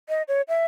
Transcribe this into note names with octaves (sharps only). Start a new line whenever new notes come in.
D#5
C#5
E5